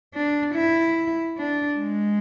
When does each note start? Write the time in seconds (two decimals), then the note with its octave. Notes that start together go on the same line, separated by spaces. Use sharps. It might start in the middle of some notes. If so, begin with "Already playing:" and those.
0.14 D4
0.55 E4
1.38 D4
1.79 G#3